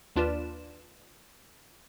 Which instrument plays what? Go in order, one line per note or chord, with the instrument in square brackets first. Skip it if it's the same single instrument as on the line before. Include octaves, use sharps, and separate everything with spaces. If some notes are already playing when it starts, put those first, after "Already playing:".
[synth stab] D#2 D4 F4 B4 D5 E7